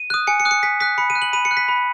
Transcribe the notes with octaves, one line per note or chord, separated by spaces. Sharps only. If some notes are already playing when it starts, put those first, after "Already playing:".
Already playing: D#7
D#6 F#6
G#5 C#7
C#7
D#6 F#6
C#7
G#5 B6
D#6 F#6 B6
B5 C#7
D#7
F#6
F#7
B5 D#7
C#7
F#6
B6
B5